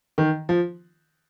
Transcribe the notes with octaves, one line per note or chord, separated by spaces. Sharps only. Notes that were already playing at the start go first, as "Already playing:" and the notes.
D#3
F3